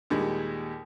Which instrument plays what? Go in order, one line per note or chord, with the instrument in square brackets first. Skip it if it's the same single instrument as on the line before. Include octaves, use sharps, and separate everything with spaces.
[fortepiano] D#2 A#2 G3 G#3